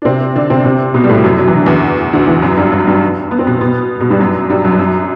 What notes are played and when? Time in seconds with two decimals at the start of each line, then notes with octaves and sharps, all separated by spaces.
0.02 D4
0.05 C3 C4
0.35 D3 D4
0.50 C3 C4
0.65 C3 C4
0.94 B2 B3
1.04 G3
1.09 A2 A3
1.24 F#2 F#3
1.39 F#3
1.48 E3
1.57 D3
1.66 E2 E3
2.13 D2 D3
2.27 E2 E3
2.42 F#2 F#3
2.57 G2 G3
2.72 F#2 F#3
2.87 G2 G3
3.31 B3
3.39 C4
3.47 B2 B3
3.61 B2 B3
4.00 B2 B3
4.10 G2 G3
4.20 F#2 F#3
4.50 G2 G3
4.64 F#2 F#3
4.79 F#2 F#3